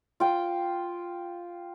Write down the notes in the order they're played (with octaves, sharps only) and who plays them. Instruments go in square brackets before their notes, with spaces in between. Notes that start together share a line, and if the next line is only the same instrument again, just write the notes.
[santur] F4 G5